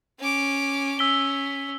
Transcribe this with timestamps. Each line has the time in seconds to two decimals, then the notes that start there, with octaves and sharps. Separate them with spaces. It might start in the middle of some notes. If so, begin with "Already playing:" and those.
0.19 C#4 D6
0.99 C#4 E6 B6 G7